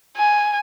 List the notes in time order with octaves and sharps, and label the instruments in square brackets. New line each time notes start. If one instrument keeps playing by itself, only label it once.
[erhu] G#5